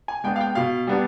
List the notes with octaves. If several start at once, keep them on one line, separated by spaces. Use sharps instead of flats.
G#5
G#3 B3 D4 G5
F5
G5
B2 F5
G3 B3 D4